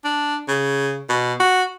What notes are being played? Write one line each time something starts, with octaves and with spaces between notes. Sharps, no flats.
D4
C#3
B2
F#4